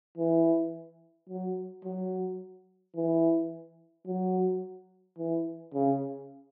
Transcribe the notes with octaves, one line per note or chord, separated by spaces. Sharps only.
E3
F#3
F#3
E3
F#3
E3
C#3